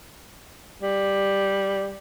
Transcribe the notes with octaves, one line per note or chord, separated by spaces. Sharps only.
G3